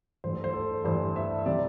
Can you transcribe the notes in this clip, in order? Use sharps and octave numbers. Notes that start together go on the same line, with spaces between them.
G2 E3 A3 C5
A4
C5
A4
G2 E3 A3 C5
E5
C3 E3 G3 D5